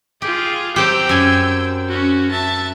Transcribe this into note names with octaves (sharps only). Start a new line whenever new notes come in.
F4 G4 G#4
F#3 C4 G4 G5 E6
F#2 G#5
C#4 F#4
E5 A5